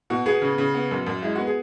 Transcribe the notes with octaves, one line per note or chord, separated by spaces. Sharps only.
B2 F#4
B3 G#4
C#3
C#3
B3
F#2
F#2
G#3 E4
B3 F#4
G#4